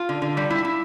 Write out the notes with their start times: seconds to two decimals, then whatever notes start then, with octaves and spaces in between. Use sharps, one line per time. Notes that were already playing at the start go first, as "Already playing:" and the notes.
Already playing: F4
0.09 D3
0.22 D3
0.37 G3
0.50 E4
0.65 E4